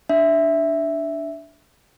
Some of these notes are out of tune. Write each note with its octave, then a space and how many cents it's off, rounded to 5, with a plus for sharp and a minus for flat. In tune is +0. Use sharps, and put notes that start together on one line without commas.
D4 +0 E5 +0